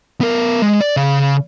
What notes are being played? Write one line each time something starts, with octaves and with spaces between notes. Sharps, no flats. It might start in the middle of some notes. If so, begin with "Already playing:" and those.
B3 A#4
G#3
D5
C#3 F5